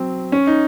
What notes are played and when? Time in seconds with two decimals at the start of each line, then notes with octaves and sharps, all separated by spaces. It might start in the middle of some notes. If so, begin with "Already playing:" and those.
Already playing: F#3 C4
0.32 C#4
0.47 D#4